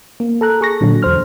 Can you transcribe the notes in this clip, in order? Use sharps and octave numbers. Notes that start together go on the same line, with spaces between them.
A#3
A4 A#5 F#6
G#4 C#6 A#6
A#2 D3 F#3
E2 D3 C5 F6